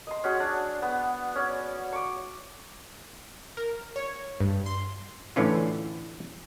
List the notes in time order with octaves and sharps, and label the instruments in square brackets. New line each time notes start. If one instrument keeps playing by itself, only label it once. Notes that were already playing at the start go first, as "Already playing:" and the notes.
[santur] D#5 C6
C#4 F#4 G#4
D4
B3
C#4 D5
C#6 D6
[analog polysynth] A#4
C#5
G2
C6
[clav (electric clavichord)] A2 D3 E3 C#4 F4